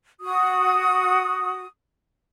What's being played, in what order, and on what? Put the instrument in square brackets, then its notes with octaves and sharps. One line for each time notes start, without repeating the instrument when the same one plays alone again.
[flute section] F#4 D#6